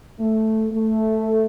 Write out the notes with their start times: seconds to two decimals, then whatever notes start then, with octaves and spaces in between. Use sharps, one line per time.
0.20 A3
0.73 A3